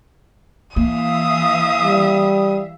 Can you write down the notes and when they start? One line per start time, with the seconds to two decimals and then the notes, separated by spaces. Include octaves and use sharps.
0.76 E3 A#3 E5 F5 D#6
1.84 G3